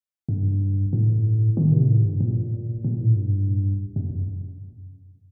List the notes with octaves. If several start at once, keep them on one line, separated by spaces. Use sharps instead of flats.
G2
A2
D#3
C3
A2
G2
A#2
A#2
A2
G2
F#2